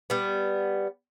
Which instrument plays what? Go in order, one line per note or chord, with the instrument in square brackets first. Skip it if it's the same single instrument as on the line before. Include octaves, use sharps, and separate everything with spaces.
[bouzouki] G3 B3